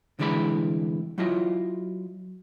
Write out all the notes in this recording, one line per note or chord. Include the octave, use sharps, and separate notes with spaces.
C2 D3 E3 G#3 D5 B5
F#3 E4 F4 D#5